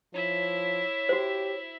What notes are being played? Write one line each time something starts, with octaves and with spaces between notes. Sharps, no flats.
F3 E4 C#5 E5
F#4 G4 C5